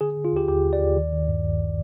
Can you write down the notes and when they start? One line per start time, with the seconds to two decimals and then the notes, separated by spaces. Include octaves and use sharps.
0.01 D3 G#4
0.17 D3
0.25 F4
0.33 D#2 G4
0.48 D#2 G4
0.65 D#2
0.73 D5
0.80 D#2
0.96 D#3
1.12 D#3
1.28 G2
1.44 G1